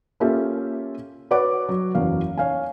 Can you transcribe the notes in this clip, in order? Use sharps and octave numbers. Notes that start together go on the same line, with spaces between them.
A#3 C#4 F4 G4 A4 E5
F#4 B4 C#5 D5 F#5 D6
F#3
F#1 E2 F#3 F5
C#5 F5 G#5